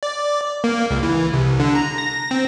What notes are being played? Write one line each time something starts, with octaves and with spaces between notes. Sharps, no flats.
D5
A#3
C#2
E3
C2
D3
A#5
A#6
C4